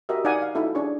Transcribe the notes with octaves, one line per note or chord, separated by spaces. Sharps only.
F#4 G4 A#4 D#5 E5
D#4 D5 F5 F#5 G#5 D#6
F5
D#4 E4 F#4 A4 E5
C#4 D4 G#4 C#5 D5 C#6